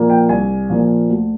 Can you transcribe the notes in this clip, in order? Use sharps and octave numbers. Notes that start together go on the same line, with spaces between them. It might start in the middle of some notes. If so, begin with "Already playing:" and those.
Already playing: A#2 F3 A#3
G5
C2 G#5
A#2 F3 A#3
D2